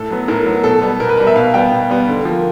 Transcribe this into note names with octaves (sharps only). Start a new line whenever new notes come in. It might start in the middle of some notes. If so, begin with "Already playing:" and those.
Already playing: A2 A4
F#3 B3
A2 A#4
F#3 B3
B2 A4
G3 B3
B2 A#4
B4
G3 B3 A#4
E5
B2 F5
G3 B3 G5
B2
G3 B3
D3
F3 A#3